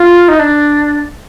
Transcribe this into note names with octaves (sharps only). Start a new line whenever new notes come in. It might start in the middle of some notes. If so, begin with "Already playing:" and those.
Already playing: F4
D#4
D4